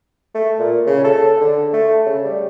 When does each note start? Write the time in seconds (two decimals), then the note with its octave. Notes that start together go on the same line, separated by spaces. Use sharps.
0.35 A3
0.59 A#2
0.87 C#3
1.05 A4
1.41 D3
1.73 A3
2.06 C#3
2.25 G3